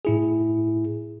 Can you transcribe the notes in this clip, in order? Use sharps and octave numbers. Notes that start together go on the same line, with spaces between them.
A2 E4 G#4